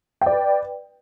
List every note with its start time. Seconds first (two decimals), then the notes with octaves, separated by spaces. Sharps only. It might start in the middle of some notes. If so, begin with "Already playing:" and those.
0.21 G5
0.26 D5
0.31 B4